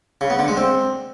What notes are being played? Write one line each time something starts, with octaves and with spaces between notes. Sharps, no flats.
C#3
B3
D3
G#3
C4